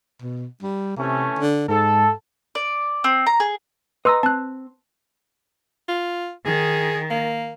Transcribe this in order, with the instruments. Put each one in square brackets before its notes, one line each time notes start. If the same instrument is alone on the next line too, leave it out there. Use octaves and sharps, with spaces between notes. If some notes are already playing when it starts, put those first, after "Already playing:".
[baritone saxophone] B2
G3
[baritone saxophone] C3 [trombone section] E3 A3 C#4
[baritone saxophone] D3
[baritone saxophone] G#2 [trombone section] A4
[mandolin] D5
C4
A#5
G#4
[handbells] B4 C6 E6 [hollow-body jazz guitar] D#5 A#5
[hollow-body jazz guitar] C4 [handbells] A5 F#6
[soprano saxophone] F4
[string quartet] D#3 [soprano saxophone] G#4
[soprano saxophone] A#3